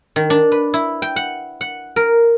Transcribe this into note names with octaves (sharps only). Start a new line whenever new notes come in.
D#3
D4
B4
E4
G5
F#5
F#5
A#4